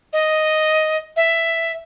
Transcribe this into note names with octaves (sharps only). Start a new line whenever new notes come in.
D#5
E5